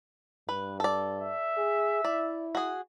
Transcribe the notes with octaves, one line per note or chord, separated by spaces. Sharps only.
G2 B4
A4 D5
E5
G#4
E4 D5
F#4 G#4